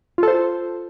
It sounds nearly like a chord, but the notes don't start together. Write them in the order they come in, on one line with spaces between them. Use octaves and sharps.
F4 A4 C5